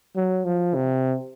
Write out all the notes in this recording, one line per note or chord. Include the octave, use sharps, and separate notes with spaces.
F#3
F3
C3